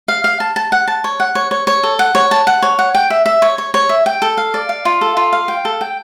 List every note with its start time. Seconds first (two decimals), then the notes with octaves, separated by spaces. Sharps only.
0.08 F5
0.24 F5
0.40 A5
0.56 A5
0.72 F#5
0.88 A5
1.04 C#5
1.20 F#5
1.35 C#5
1.51 C#5
1.67 C#5
1.83 A4
1.99 F#5
2.15 C#5
2.31 A5
2.47 F#5
2.62 C#5
2.79 F#5
2.95 G5
3.10 E5
3.26 E5
3.42 C#5
3.58 C#5
3.74 C#5
3.89 E5
4.06 G5
4.22 A4
4.37 F5
4.54 D5
4.69 F5
4.85 F4
5.01 A4
5.17 F4
5.33 F5
5.48 G5
5.65 A4
5.81 G5